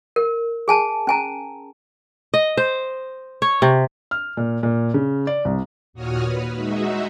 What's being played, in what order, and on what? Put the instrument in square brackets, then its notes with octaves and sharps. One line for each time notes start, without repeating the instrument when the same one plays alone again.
[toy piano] A#4
G#4 G#5 A5
C#4 G#5 A#5
[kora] D#5
C5
C#5
C3
[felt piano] F6
A#2
A#2
C#3
D5
C2
[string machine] D#2 A#2 F#4 C#5 D#6 F6
B4
G#3 D#4 F#4 E5